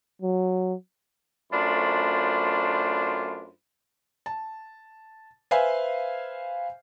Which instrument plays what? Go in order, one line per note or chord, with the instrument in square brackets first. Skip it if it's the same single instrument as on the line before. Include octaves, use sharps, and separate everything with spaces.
[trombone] F#3
[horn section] F#2 A3 D4 F4 C5 B5
[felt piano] A5
B4 C5 E5 F5 G#5